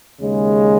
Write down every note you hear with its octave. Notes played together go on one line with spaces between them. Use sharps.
D#2 C#3 G#3